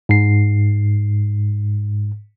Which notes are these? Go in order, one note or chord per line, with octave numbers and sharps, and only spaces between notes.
G#2 C7